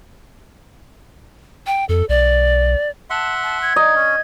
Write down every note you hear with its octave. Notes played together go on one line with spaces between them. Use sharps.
G5
F2 A4
B1 D5
E5 F#5 A5 C6
A5
G#6
D#4 D#5
C#4